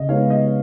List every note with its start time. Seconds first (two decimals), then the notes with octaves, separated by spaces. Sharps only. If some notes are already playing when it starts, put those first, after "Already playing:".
Already playing: C#3 D#5
0.08 G#3 B3 D#4 C#5 F5
0.30 D#5